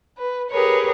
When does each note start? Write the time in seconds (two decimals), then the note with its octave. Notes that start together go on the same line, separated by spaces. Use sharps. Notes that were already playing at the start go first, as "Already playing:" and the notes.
0.18 B4
0.50 G4 G#4 A#4 B4 C#5